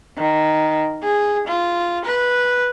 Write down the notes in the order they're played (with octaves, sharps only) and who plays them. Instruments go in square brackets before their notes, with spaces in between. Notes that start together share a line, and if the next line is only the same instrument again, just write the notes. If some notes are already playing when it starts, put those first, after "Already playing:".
[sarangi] D#3
G#4
F4
B4